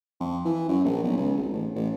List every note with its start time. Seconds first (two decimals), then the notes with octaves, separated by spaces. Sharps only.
0.20 F2
0.45 E3
0.68 F#2
0.85 A#1
1.04 B1
1.17 C#2
1.37 G#1
1.53 A1
1.75 A1